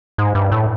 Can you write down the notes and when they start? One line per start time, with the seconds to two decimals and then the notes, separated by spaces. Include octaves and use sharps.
0.18 G#2
0.35 G2
0.52 A2